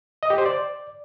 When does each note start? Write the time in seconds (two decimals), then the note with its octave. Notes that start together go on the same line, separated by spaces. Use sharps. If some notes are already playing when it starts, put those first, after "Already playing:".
0.23 D#5
0.30 G4
0.38 C5
0.46 D5